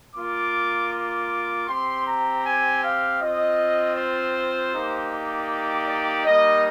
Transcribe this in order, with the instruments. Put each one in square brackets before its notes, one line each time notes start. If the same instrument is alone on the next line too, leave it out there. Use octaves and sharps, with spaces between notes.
[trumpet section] A#3 F4 D6
D6
C4 G4 C6
A#5
G#5
F5
C4 F4 D#5
C5
A#3 D#4 G4
D5
D5
G3 A#3 D#4 D#5